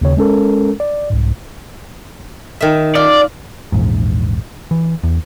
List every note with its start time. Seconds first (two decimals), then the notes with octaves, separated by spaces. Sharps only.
0.01 D#2 C#3 C#5
0.17 G#3 C#4 A4 A#4
0.80 D5
1.10 C2 G#2
2.60 D#3 E5
2.95 F4 D5
3.72 A#1 E2 G#2
4.71 E3
5.03 E2